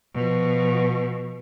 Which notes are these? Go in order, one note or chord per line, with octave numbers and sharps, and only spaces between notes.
B2 F3